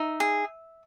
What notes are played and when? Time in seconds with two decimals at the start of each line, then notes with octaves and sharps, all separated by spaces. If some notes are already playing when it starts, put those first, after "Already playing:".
Already playing: D#4 E5
0.20 G#4